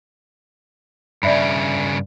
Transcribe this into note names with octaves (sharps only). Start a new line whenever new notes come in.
G2 C#3 D5 E5 B5